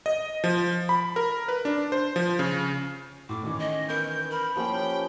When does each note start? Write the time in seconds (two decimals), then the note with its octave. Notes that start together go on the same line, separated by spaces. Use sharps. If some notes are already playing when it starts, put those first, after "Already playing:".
0.06 D#5
0.44 F3
0.89 B5
1.16 A#4
1.48 B4
1.65 D4
1.92 C5
2.16 F3
2.39 C#3
3.29 A2 D6
3.43 D#3 E3 C#4
3.59 D#5
3.89 B3 A#4 G6
4.30 A#4 B5
4.56 F3 A#3 C#4 G4 G5